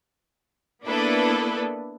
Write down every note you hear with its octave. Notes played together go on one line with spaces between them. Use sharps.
A#3 B3 D4 E4 A4 B4